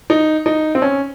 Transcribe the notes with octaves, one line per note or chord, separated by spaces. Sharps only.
D#4
D#4
C4
C#4